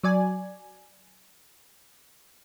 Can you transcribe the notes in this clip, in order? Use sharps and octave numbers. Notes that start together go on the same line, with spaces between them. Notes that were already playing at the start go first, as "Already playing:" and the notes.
F#3 D5 G#5